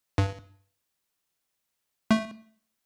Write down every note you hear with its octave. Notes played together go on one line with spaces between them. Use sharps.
G2
A3